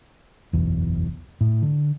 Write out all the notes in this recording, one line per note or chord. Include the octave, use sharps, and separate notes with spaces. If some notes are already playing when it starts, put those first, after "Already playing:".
F#1 B1 E2
A2
D3